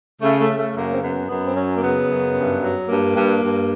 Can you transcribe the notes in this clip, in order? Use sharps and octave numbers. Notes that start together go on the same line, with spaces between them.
C#3 A3
A3
C#3
A3
F#2 A#3
C4
F#2 B3
F#2 B3
C4
F#3 C#4
A#3
C#3 B3
F#2
G2
F#3
G2 A#3
G2
G2